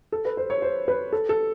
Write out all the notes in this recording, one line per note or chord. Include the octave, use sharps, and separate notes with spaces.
A4
B4
C5
C#5
C5
B4
A4
A4